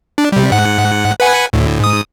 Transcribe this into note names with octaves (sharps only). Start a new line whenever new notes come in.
D4
C3 G3
G#2 F#5
B4 F#5 G#5
D2 A2
G#2 D#6